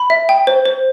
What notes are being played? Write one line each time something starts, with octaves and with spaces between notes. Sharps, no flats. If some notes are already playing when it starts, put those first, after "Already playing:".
Already playing: B5
E5
G5
C5
C5